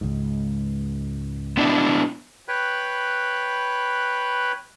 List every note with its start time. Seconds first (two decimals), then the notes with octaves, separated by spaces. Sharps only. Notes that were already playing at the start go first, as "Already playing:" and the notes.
0.01 C#2 G#2
1.57 B3 D4 E4
2.48 B4 C#5 G5 B5 F#6